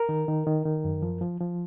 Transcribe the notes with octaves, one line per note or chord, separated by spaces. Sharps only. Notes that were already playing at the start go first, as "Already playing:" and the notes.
Already playing: A#4
D#3
D#3
D#3
D#3
F#2
F3
F3
F3